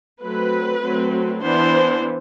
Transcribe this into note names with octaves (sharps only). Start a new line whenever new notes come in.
F#3 A3 C4 B4
F#3 A3 C4
E3 B3 D4 C5